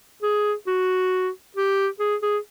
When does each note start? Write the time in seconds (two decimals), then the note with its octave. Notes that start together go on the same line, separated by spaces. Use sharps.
0.23 G#4
0.67 F#4
1.56 G4
2.00 G#4
2.22 G#4